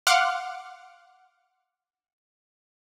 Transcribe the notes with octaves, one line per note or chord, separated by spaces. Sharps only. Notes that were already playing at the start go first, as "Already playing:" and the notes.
F5 F#5 C6 D6 F6